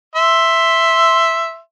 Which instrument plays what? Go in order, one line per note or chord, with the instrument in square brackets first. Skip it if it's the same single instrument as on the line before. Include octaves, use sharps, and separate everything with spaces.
[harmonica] E5 C6